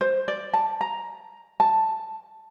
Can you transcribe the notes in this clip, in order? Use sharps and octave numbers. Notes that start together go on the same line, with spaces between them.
C5
D5
A5
A#5
A5